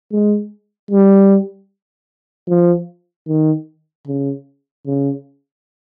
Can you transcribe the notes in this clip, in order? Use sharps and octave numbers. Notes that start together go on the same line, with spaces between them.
G#3
G3
F3
D#3
C#3
C#3